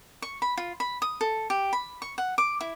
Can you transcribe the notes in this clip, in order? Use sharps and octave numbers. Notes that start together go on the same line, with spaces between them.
C#6
B5
F4
B5
D#6
A4
G4
B5
C#6
F#5
D6
E4